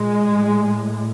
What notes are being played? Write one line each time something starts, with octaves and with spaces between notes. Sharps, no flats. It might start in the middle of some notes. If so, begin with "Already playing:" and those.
Already playing: A#2 G#3
A2